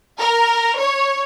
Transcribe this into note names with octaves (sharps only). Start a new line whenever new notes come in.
A#4
C#5